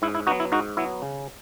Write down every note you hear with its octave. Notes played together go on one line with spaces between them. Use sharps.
G#2 E4
E4
F#3 B3 D#4 F#4
E4
G#2 D#4 F#4
F#3 B3 E4
C#3